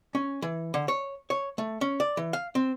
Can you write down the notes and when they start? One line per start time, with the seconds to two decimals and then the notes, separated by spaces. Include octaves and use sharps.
0.15 C#4
0.42 E3
0.74 D3
0.88 C#5
1.30 C#5
1.58 A3
1.81 C#4
2.00 D5
2.17 E3
2.33 F5
2.55 C4